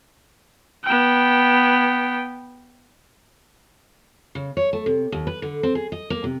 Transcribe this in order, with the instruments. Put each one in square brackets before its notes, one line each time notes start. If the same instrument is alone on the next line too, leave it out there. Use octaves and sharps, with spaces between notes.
[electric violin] B3 G5
[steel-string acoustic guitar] C#3
C#5
A3
C3
D#2
B4
D3
C4
G#4
D#5
A#3
C3